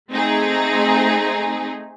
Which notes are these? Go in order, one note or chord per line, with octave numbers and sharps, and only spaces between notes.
A3 C4 D#4 G#4